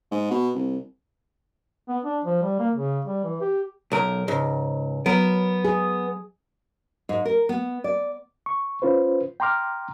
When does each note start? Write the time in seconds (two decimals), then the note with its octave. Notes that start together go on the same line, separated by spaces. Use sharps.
0.11 G#2
0.31 B2
0.55 C2
1.88 B3
2.04 D4
2.25 F3
2.42 G3
2.59 A#3
2.75 C#3
3.05 G3
3.24 E3
3.41 G4
3.92 B1 A#4
4.28 C#2 G#2
5.06 F#3 B3 A#4
5.65 G#4
7.09 G#2
7.25 A#4
7.49 B3
7.84 D5
8.46 C#6
8.82 C#4 F4 B4 C5
9.40 G5 A#5 C6 D6 F6